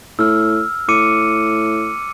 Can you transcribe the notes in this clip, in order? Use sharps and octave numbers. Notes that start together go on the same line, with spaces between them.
A2 E6 F6
A2 D6 C#7 D#7